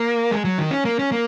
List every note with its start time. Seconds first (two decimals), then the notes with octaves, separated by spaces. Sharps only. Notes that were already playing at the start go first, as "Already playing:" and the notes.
Already playing: A#3
0.31 G#3
0.45 F#3
0.58 D#3
0.71 C#4
0.85 A#3
0.99 C#4
1.12 A#3